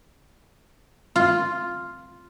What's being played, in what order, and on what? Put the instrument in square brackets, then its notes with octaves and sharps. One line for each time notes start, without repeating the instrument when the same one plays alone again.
[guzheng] F4